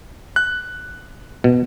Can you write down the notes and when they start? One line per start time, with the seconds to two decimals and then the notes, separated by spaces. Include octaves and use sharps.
0.36 F#6
1.44 B2